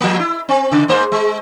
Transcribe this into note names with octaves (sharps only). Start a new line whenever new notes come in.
F3 A#3
E4
C4
C#3
G#2 A#3 C5
G#3